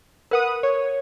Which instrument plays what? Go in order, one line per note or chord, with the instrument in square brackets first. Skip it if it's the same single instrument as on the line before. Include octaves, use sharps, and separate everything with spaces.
[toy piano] A#4 [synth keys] B4 F#5 D#6
[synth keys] C#5